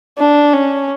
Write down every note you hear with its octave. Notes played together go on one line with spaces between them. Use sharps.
D4
C#4